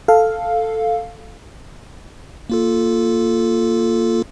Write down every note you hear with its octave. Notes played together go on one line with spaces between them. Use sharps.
A4 F5
A#3 F4 A4